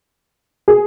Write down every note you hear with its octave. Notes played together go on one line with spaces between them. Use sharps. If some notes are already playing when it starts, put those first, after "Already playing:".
G#4